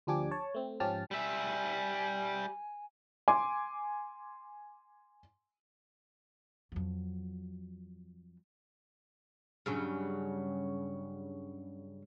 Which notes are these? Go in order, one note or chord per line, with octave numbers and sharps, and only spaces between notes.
D2 F3 D4 G4 G#5 D6
C#5 A5
A3 C4
G#2 F3 C#4 G4 A5 F6
G3 E5 G#5
G#5 C6 D6
F2 F#3
G2 C#3 F#3